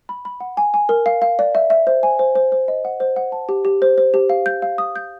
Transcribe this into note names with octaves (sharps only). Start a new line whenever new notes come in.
B5
B5
F#5
G#5
G#5
A#4
F5
F5
D5
E5
E5
C5
G#5
C5
C5
C5
D#5
F#5
C5
F#5
A5
G4
G4
C5
C5
G4
F5
G6
F5
D#6
G6